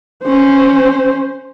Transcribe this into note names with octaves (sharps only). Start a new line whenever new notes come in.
C#4 C5